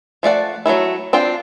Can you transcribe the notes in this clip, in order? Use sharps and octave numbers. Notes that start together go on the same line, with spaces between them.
F3 A3 D5 F#5
F#3 G#3 A3 E4
C4 D4 F4 G5